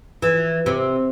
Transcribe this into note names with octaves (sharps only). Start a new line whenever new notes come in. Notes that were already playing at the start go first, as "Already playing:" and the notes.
E3
C3